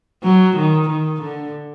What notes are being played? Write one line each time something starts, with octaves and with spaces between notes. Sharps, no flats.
F#3
D#3
D#3
D3